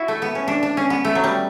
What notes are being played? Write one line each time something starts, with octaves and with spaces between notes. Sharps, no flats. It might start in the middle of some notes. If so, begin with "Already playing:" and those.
Already playing: E4 F#4
A3
B3
C#4
D4
D4
C#4
B3
A3
F#3
G3